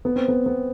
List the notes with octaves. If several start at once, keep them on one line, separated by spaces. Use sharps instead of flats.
B3
C4
B3
B3